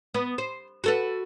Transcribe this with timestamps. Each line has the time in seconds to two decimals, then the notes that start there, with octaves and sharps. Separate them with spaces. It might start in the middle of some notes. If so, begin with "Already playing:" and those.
0.14 B3
0.38 C5
0.84 F#4 A4 B4